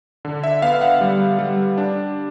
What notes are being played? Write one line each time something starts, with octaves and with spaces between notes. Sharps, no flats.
D3
E5
B3 F5
F#5
G3
G3
D4